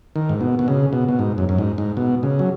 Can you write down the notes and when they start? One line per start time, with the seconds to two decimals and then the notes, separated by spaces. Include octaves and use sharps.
0.16 D#3
0.29 G#2
0.41 B2
0.59 B2
0.68 C#3
0.93 B2
1.08 B2
1.19 G#2
1.38 F#2
1.49 F#2
1.58 G#2
1.78 G#2
1.97 B2
2.23 C#3
2.39 F#3